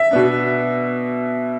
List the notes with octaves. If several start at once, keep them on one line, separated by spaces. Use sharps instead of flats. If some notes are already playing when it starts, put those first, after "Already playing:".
Already playing: E5
B2 B3 D4